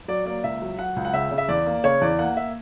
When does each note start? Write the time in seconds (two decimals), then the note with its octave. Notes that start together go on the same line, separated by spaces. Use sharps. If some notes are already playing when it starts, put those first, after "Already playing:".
0.08 F#3 D5
0.26 A#3 D5
0.44 C#2 E5
0.62 F#3
0.78 F#3 F#5
0.96 C#2
1.05 F#5
1.14 C#3 E5
1.31 C#3
1.38 E5
1.48 E2 D5
1.66 A#3
1.84 C#3 C#5
2.01 E2 D5
2.19 A#3 F#5
2.36 A#3 E5